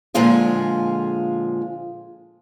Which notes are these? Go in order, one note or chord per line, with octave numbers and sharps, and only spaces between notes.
A#2 D3 F3 G#3 F4 G#4